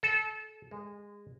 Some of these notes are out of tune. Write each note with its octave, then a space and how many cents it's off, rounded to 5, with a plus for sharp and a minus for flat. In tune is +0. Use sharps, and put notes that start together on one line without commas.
A4 -25
G#3 -20